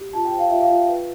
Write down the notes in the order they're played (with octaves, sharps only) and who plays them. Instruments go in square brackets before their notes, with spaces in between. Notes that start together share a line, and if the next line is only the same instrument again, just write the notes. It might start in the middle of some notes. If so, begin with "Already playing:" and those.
Already playing: [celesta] G4
F4 A5
G5
C5
F5
F4 E5
F5
F4
B4